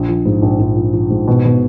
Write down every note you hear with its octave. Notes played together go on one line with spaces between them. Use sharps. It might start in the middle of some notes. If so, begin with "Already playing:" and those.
Already playing: A#1
F3
G#2
A#1
A#1
F3
F3
G#2
B2
B2